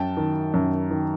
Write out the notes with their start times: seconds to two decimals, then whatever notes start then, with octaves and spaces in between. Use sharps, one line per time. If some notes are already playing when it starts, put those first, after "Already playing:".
Already playing: F#2 G5 A5
0.17 D#3
0.54 F#2
0.91 D#3